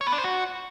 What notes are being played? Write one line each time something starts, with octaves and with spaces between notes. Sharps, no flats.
C#5
B3
D4
C5
F#4